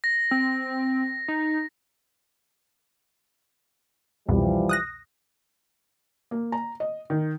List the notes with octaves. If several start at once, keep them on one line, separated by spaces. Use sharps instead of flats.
A#6
C4
D#4
C2 F2 B2 E3 F3 G3
D#6 F#6 A#6
A#3
A#5
D#5
D#3